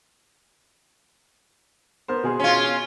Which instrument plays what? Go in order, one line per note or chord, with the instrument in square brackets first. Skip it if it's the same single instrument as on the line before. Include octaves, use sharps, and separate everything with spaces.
[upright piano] B3 A#4 C5
B2 G#4 C6
[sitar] C#4 F4